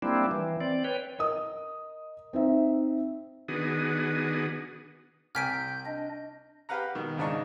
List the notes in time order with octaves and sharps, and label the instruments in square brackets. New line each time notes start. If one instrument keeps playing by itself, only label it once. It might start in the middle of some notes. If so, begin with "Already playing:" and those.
[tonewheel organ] G3 A#3 C4 D4 E4
E3
C4 D5
B4 C#5 G5
[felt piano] A#4 D#5 D#6
C4 D#4 E5
[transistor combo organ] D#3 B3 D4 F#4 G#4 D#6
[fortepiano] C2 G5 G#5 [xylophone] F6 B6 D7 [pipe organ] G6
[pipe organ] D4 D#5
[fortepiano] G4 B4 F5 F#5 A#5
B2 D#3
G#2 C#3 D4 D#4 A5 C#6